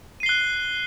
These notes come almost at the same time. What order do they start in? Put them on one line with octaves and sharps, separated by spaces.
D#7 C7 G7 F#6